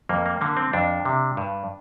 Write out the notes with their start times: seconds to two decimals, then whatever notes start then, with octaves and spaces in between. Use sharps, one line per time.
0.09 F2 A#3
0.26 A#3
0.41 D3 A#3
0.57 C4
0.73 F2 D4
1.05 C3
1.37 G2